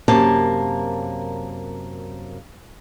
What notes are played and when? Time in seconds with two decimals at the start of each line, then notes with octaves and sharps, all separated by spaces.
0.08 F#2 C3 A#3 A5